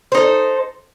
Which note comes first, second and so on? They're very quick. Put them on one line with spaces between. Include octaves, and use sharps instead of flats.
C5 D#4 A4